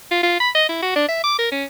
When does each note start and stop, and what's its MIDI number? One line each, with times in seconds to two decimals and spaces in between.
0.12 0.21 65
0.23 0.37 65
0.40 0.50 83
0.55 0.65 75
0.69 0.78 64
0.83 0.95 66
0.96 1.07 62
1.09 1.20 76
1.24 1.37 86
1.39 1.47 70
1.52 1.65 61